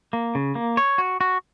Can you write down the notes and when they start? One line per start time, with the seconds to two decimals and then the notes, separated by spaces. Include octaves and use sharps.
0.13 A#3
0.35 C#3
0.55 A#3
0.77 C#5
0.98 F#4
1.21 F#4